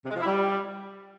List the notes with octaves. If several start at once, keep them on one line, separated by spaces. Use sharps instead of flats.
C3
G#3
F3
E4
G3